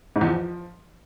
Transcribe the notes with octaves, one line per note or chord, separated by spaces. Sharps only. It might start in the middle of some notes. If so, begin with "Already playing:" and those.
G#2
E2
F3